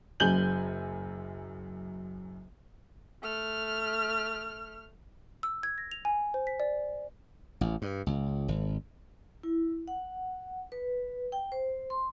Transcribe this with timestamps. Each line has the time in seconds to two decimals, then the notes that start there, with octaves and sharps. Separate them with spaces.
0.20 F#1 F#2 G#5 G6 F#7 G7
3.22 A3 F6
5.43 E6
5.63 G#6
5.78 A#6
5.92 F7
6.05 G#5
6.34 C5
6.47 B6
6.60 D5
7.61 A1
7.82 G2
8.06 C#2
8.48 G#1
9.43 E4
9.88 F#5
10.72 B4
11.32 G5
11.52 C5
11.90 C6